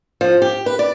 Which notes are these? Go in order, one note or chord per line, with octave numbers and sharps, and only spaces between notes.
F3
G4
B4
D5